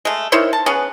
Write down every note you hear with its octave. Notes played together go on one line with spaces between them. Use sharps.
G#3 A3
D#3 E4 C5 C#5
A5
B3 C#4 G#4 B4